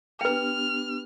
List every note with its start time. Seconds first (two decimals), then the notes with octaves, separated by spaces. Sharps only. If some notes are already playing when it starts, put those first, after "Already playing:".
0.21 B3 D4 G4 B4 G5 F6